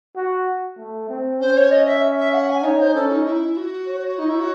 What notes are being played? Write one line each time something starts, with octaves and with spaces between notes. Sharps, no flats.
F#4
A3
C4
C#4 C5
C#5
D#5
E5
E5
F#5
G#5
D#4 C#5
C5
C#4 A4
D#4
E4
F#4
C#5
D#4
E4
F#4